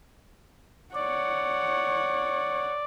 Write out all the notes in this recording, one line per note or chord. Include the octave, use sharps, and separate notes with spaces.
C#5 D5 F#5